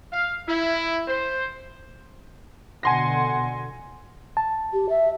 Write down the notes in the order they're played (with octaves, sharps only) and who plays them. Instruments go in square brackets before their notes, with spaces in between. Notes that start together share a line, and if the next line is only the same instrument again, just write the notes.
[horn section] F5
E4
C5
[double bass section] B2 D3 [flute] F#5 [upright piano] G#5 C6 A#6
[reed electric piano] A5
[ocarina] G4
E5